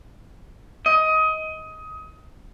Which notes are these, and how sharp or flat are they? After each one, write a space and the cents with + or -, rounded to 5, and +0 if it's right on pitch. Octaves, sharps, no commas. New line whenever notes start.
D#5 +20